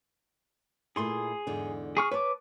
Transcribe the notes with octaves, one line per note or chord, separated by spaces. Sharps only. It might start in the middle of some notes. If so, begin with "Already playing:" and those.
A#2 A3 E4 G#4 C6
E2 G#2 D3
G#4 C#6 F6
B4 C#5 A5 D6